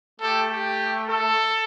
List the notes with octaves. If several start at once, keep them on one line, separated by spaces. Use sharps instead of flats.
A3 G4 A4
G4
A4